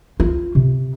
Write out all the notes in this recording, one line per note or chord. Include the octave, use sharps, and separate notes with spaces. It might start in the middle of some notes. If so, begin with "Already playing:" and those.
F4
C3